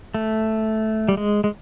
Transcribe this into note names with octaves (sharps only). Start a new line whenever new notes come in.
A3
G3
G#3
G#3